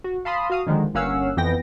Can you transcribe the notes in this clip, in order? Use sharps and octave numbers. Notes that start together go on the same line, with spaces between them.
F#4
F5 A5 B5 C6 D#6
F#4 F5 D#6
D3 D#3 F3 G#3
G1 A#3 C#4 F5 F#5 E6
F2 E3 B3 G5 A#6